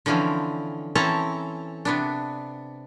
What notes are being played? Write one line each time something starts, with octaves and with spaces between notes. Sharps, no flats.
D3 E3 F3 C4 C#4
E3 C4 C#4 A4 A5 A#5
C3 B3 D4